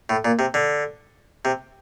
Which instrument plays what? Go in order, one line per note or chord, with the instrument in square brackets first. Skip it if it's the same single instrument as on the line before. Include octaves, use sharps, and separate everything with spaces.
[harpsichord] A2
A#2
C3
D3
C3